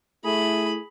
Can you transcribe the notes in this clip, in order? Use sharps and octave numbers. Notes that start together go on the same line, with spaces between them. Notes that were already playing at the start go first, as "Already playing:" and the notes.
A3 E4 G#4 B5